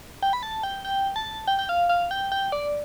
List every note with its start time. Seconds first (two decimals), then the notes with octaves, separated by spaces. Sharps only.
0.23 G5
0.33 B5
0.43 A5
0.63 G5
0.85 G5
1.16 A5
1.48 G5
1.59 G5
1.69 F5
1.89 F5
2.11 G5
2.32 G5
2.52 D5